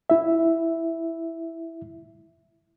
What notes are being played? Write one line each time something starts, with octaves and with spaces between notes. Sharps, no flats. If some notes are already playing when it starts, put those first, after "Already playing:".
E4 E5